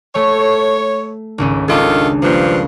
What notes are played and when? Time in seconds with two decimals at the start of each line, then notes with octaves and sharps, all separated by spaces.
0.15 A3 C#5
1.38 G#1 C#2 C#4
1.68 C#2 D#3 D4 F4 A4
2.22 G2 F3 A#3